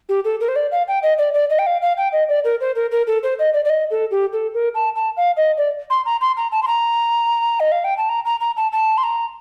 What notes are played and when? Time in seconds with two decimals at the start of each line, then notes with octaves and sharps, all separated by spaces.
0.09 G4
0.25 A4
0.40 A#4
0.48 C5
0.56 D5
0.72 F5
0.88 G5
1.03 D#5
1.18 D5
1.34 D5
1.50 D#5
1.59 G5
1.66 F5
1.82 F5
1.97 G5
2.12 D#5
2.29 D5
2.44 A#4
2.61 C5
2.75 A#4
2.91 A#4
3.07 A4
3.23 C5
3.39 D#5
3.54 D5
3.65 D5
3.69 D#5
3.91 A4
4.11 G4
4.33 A4
4.54 A#4
4.75 A5
4.95 A5
5.17 F5
5.37 D#5
5.57 D5
5.90 C6
6.06 A#5
6.21 C6
6.37 A#5
6.52 A5
6.63 C6
6.67 A#5
7.60 D#5
7.72 F5
7.84 G5
7.97 A5
8.09 A#5
8.25 A#5
8.40 A#5
8.57 A5
8.72 A5
8.98 C6
9.03 A#5